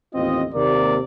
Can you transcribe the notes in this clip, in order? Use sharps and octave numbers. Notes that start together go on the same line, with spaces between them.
A1 D#2 C4 F4 D#5
D#2 C3 A#3 A#4 D5